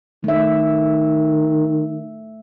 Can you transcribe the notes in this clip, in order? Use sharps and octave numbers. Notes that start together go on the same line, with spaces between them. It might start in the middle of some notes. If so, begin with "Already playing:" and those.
D#3 A3 E5